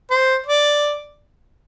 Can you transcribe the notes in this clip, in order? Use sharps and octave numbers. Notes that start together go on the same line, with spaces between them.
C5
D5